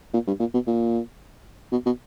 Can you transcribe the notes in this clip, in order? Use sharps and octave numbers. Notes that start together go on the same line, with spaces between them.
A#2
G2
A#2
B2
A#2
B2
B2